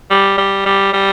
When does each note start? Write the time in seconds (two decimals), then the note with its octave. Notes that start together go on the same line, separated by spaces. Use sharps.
0.11 G3
0.38 G3
0.66 G3
0.93 G3